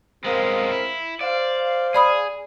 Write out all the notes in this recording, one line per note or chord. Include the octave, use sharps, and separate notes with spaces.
G#3 B3 C4 A#4 F5
E4
C5 D5 F5
G#4 D5 B5 D#6